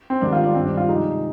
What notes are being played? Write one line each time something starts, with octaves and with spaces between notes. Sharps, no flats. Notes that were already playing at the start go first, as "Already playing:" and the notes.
C4
G#2 D#3 G3 D4
F4
D4
G2 D#3 G3 C4
D4
F4
C3 F3 G#3 D#4